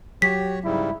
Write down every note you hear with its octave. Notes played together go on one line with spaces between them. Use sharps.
F#3 F#4 G4 C#5 B6
G#2 C#3 G3 E4